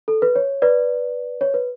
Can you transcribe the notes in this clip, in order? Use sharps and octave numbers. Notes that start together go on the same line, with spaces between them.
A4
B4
C#5
B4 D5
C#5
B4